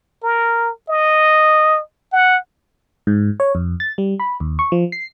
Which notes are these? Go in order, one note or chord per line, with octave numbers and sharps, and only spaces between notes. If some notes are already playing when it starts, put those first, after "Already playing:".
A#4
D#5
F#5
G#2
C#5
F2
A6
G3
B5
D#2
C#6
F3
C7